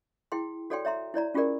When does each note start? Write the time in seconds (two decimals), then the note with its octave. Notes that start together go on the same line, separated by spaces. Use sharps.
0.32 E4 G#4 G5 C6
0.70 F#4 A4 C#5 D5 G5 C6
0.85 C#5 E5 A#5 C6
1.14 E4 C#5 D5 A#5
1.34 C#4 F4 G4 G#4 A#4 D5